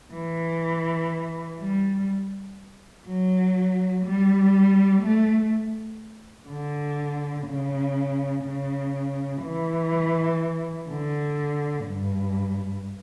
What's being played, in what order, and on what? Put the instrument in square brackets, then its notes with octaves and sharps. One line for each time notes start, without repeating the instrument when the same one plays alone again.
[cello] E3
G3
F#3
G3
A3
D3
C#3
C#3
E3
D3
G2